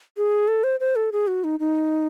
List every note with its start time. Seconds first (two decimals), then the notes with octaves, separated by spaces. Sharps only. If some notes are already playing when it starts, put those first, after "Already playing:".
0.17 G#4
0.48 A4
0.64 C5
0.80 C5
0.96 A4
1.12 G#4
1.27 F#4
1.44 D#4
1.60 D#4